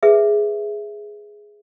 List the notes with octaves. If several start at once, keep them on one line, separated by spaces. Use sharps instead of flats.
G#4 B4 E5